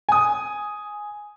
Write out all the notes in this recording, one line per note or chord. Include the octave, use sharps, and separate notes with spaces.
G#5 D#6